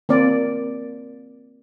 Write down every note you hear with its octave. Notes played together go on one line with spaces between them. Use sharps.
A#3 C4 D5